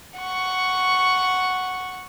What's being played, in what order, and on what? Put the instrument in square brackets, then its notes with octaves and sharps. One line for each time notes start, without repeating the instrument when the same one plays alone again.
[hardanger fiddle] F#5 C#6